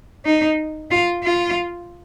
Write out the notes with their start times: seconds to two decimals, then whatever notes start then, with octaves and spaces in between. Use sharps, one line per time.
0.25 D#4
0.91 F4
1.23 F4